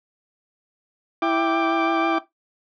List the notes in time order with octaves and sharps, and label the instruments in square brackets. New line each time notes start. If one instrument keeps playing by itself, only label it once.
[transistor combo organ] E4 G5 D6